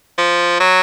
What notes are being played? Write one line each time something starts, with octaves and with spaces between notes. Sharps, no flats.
F3
F#3